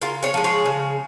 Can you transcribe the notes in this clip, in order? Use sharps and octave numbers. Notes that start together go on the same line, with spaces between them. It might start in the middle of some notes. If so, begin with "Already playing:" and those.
C#3 F4 A#4
G#4 C#5
F3 G#3
G#4 C#5
C#3